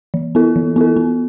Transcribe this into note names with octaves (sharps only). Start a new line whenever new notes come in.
E3
B3 E4 A4
E3
B3 E4 A4
B3